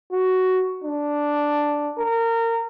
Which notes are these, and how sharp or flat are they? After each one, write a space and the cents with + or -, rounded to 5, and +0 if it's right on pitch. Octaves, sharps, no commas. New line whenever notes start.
F#4 +10
D4 +0
A#4 -25